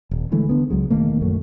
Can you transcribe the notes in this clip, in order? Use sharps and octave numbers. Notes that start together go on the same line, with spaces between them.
D#1
D3 E3 G#3 A3
D3 B3
C#2 F#3 G#3
E1 D#3 A3 A#3
A#1 F#2 F#3 A3